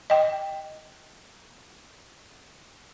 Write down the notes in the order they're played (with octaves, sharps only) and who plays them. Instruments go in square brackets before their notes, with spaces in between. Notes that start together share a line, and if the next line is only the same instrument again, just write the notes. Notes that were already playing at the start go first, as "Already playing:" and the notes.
[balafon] D#5 G5